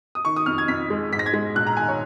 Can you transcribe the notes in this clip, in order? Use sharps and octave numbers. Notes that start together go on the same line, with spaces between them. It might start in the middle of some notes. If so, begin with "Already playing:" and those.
D#6
D#3 C#6
D#6
F2 F6
G#6
F2 B6
G#3
G#2 B6
A#6
G#6
G#3 A#6
A#1 F#6
A#5
D#3 G#5
C#5